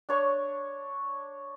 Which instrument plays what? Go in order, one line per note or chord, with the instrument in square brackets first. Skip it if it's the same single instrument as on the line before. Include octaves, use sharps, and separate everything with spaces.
[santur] D4 C#5 C#6